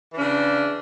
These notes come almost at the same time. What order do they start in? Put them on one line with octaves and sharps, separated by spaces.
E3 D4 C#3